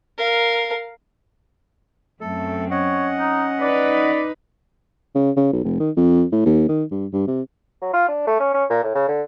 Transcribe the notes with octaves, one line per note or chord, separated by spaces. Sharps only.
A#4 F5
F#2 A3 C4 A4
C#4 C#5 D#5 F#5
D#4
D#4 B4 D5
C#3
C#3
B1
F1
D#3
F2
A2
D#2
D#3
G2
G2
C3
F#3
F4
D4
A3
C#4
C#4
A#2
A2
C#3
D3